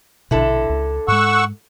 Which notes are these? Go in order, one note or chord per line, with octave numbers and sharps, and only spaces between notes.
A#1 B2 D3 E4 A4
C#2
G#2 G#3 F#5 C#6 E6